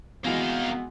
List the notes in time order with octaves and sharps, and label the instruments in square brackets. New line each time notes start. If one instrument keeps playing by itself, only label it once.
[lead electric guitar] C2 F5 [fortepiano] B2 E3 G#3 [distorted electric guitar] A#3 D#4 [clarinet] B3